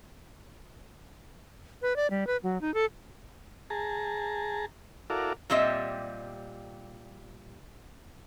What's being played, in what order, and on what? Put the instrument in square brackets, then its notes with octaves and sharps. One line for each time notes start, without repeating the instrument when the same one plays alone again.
[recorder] B4
D5
G3
B4
F#3
D#4
A4
[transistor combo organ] G#4 A5 A#5
E4 F#4 A4 A#4 D5 F5
[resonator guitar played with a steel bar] A#2 G3 C4 G4 D#5 E5